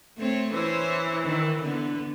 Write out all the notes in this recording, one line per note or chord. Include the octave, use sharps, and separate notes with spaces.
A3 C4 C#5
E3 C#4 E4 C5 C#5
D#3
D3 B3